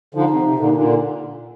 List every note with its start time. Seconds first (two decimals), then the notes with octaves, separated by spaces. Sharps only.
0.15 D3 F3 D#4
0.30 C3
0.44 C3
0.59 A#2 D3
0.74 A#2 D3